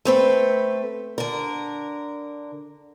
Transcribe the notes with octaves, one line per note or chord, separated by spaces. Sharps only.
A3 C4 B4
D3 A#4